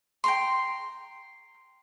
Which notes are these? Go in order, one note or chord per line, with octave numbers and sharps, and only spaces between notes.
G5 A#5 C6